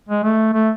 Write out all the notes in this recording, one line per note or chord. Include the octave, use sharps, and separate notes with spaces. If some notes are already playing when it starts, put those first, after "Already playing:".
G#3
A3
A3